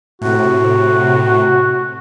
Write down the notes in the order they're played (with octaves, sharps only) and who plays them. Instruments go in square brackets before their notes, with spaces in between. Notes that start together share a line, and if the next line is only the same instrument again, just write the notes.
[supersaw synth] A2 C3 [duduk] F#4